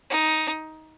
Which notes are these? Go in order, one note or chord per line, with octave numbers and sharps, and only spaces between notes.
D#4